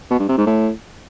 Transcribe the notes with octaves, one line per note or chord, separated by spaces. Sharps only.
B2
G2
C3
G#2
A2